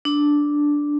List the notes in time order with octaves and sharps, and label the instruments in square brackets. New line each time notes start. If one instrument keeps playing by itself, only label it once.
[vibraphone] D4